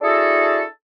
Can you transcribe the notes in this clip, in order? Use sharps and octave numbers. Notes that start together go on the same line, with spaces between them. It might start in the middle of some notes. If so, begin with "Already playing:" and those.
D4 E4 F#4 G#4 A4